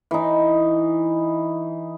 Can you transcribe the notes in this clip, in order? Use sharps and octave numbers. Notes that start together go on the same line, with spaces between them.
E3 D#4